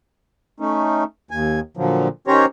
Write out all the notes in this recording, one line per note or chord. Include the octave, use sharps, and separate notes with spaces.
A3 C#4 D#4
D#2 G#5
A#2 D3 F3 F#3
D#3 C#4 G4 C5 C#5 A#5